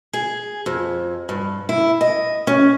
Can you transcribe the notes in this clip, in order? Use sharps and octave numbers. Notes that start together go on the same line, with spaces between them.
G#4
F2
G2
E4
D#5
C#4